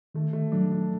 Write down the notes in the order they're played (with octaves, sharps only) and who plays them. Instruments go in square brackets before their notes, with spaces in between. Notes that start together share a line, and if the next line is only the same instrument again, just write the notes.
[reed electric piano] D#3 [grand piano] A3
[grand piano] A3
[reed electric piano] F#3 [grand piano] D4
[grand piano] D4